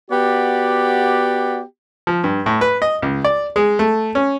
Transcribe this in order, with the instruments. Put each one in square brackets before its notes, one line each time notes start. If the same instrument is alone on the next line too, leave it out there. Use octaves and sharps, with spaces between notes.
[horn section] B3 F#4 G4 D5
[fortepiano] F3
G2
A2
B4
D#5
C#2
D5
G#3
A3
C#4